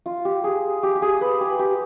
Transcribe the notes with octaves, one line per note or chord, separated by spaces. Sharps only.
F4
G4
G#4
G4
G4
G#4
B4
G4
G4